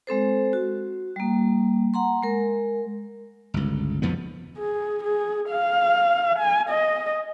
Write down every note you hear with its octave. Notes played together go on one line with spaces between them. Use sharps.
G#3 C4 A4 C5
F#4
G3 A#3
F#5 A#5 C6
G#3 A#4
G1 C#2
B1 F2 F3 B3
G#4
G#4
F5
G#5
D#5